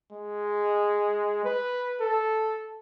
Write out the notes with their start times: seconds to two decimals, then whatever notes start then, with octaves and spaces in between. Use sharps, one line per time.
0.12 G#3
1.45 B4
2.00 A4